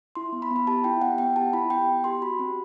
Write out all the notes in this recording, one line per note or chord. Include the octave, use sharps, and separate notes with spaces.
E4 C6
B3
B5
B3
B5
G4 A5
E4 G5
B3 F#5
B3 G5
G4 A5
E4 B5
B3 G5
B3
G4 C6
F#4 B5
C4